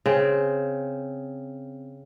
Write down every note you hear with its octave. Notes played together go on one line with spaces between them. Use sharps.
C#3 C4